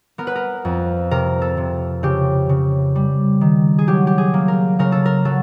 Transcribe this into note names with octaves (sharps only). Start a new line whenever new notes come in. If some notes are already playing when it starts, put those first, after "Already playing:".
B3 A#4
B4
A#4
F2
C3 A#4
A4
C3
C#3 G4
C#3
G3
D#3
G#4
F#3 G4
G4
G#4
A#3
A#4
C#3 A#4
A4
A#4
F#3 A4